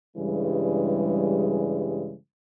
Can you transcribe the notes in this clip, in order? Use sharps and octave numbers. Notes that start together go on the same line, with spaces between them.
G2 C#3 E3 G3 G#3